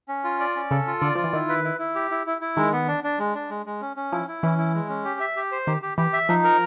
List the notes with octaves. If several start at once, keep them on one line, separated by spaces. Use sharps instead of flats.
C#4
F4
D5
C#4
C#3 A4
F4
D3 D5
F3 F4
E3
D#3 E4
B4
E4
E4
G4
E4
E4
E4
D#3 G#3
B3
D4
D4
G#3
D4
G#3
G#3
C#4
C#4
F3 E4
E4
E3 C#4
E4
G#3
C#4
G4
E5
G4
C5
D#3 G4
G4
E3 G4
E5
F3 D#4
A#4